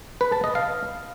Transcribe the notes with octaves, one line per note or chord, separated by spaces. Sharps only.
B4
A5
D#5
F5